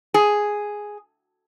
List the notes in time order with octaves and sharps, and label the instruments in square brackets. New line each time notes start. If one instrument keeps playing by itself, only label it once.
[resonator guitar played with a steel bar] G#4